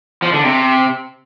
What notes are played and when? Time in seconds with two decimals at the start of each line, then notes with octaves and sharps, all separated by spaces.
0.22 F3
0.33 D3
0.44 C3